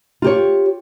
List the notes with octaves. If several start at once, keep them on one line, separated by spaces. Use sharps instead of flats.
F4 G4 C#5